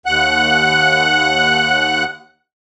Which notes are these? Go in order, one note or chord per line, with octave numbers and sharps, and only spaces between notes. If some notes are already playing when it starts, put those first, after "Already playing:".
D#2 F#5 F#6